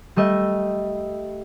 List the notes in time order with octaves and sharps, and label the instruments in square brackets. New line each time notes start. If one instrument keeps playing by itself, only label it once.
[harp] G3 A3 D#5 E5